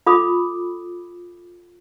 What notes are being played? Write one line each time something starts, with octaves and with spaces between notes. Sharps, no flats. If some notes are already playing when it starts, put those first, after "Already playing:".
F4 A4 B5 D6 D#6